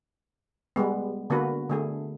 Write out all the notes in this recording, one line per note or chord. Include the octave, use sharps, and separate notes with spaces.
G3 G#3 B3
D3 A#3 B3 F#4 B4
D3 A3 G#4